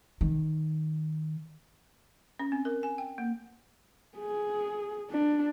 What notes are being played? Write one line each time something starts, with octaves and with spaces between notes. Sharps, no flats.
D#3
C#4
C4
A#4
G#5
G5
A#3
G#4
D4